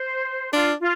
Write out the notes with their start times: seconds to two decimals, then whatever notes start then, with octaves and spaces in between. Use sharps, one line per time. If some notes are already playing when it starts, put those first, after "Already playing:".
Already playing: C5
0.53 D4 F4
0.80 F4